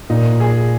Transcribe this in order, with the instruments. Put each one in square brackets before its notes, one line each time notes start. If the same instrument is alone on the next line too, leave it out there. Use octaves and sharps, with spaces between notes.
[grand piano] A#2 [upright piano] D#4
[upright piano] G#4